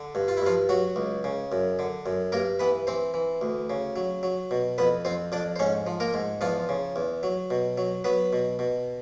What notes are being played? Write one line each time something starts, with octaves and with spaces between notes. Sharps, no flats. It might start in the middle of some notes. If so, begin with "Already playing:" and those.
Already playing: D3
G2
F4
E4
G2 F3 F4
F#3 F#4
C#2
C#3
F#2
D3
F#2
G2 A#3 A#4
E3 B3 B4
E3 C4 C5
E3
D2
C#3
F#3
F#3
B2
F2 B3 B4
F2 C4 C5
F2 D4 D5
C5
G#2 C#4 C#5
F3
A#3 A#4
G#2
E2 F3 F4
C#3
E2
F#3
B2
F#3
F#3 B3 B4
B2
B2